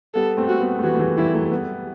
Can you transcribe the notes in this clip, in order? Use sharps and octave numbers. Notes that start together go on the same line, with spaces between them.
G3 B3 A4
A3 C4
F#4
G3 B3
A3
E3 G3 F#4
A3
E3 G3
E3 G3 E4
F#3 A3
G3 B3